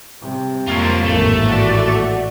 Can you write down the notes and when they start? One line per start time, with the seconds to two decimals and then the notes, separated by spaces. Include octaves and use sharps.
0.21 C3 G3
0.67 F2 A#3 F4 C#5
1.04 A1 D#2 G#2 A3
1.47 F#4 D5